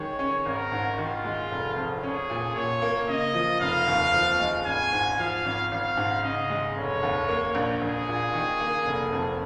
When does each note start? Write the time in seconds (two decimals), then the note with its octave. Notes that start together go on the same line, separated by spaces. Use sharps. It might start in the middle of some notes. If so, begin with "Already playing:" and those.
Already playing: D#3 G#3 C#5
0.19 C#4
0.45 G#1 A#4
0.72 G#2
0.98 D#3 F4
1.24 G#3
1.51 F1
1.76 F2
2.03 C#4 G#4
2.30 A#2
2.56 A#2 C#5
2.82 A#3
3.08 C#3 D#5
3.34 F3
3.61 F1 F5
3.87 D#2
4.14 F3
4.40 G#3
4.66 G#1 G#5
4.92 G#2
5.19 F3 F5
5.45 G#1
5.71 G#1 F5
5.97 G#2
6.24 C#3 D#5
6.50 G#3
6.76 F1 C#5
7.03 D#2
7.28 A#3
7.55 A#1
7.81 A#1 G#4
8.08 A#2
8.34 D#3
8.60 A#3
8.86 F1
9.12 F2